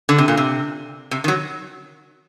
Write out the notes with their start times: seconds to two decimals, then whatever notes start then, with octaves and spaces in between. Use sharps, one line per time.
0.09 D3
0.18 C3
0.28 A#2
0.37 C3
1.11 C3
1.24 D#3
1.28 F#3